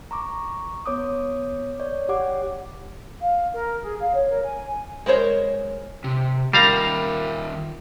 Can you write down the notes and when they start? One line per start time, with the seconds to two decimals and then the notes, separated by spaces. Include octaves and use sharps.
0.11 A#5 C#6 D6
0.86 B3 C#5 D6 D#6
1.80 C#5 D5
2.09 G4 C#5 F#5 D6
3.20 F5
3.54 A#4
3.82 G#4
3.99 F5
4.13 C#5
4.30 A#4
4.44 G#5
5.06 G#3 A#4 C5 C#5
6.04 C3
6.53 D#3 G3 F4 A#4 F5 A#5